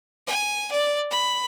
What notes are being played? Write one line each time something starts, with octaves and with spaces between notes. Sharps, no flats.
G#5
D5
B5